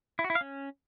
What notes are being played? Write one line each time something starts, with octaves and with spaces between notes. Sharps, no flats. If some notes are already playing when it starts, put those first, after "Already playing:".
E4
F#4
E4
F5
C#4